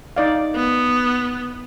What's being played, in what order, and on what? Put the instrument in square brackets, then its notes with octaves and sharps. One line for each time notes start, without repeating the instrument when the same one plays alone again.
[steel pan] D#4 D5 F5
[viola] B3